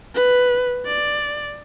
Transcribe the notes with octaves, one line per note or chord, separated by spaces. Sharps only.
B4
D5